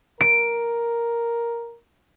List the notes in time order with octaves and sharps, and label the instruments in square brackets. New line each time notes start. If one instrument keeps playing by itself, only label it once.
[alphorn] A#4 [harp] D7